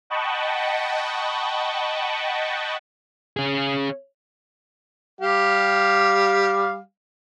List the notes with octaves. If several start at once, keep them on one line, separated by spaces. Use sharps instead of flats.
D#5 F#5 G5 A5 B5 C#6
C#4 G#4
G3 G4 F5